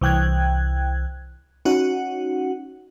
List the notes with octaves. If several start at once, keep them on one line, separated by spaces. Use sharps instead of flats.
C2 E3 G5 F#6 G#6
C#4 D#4 F#4 F#5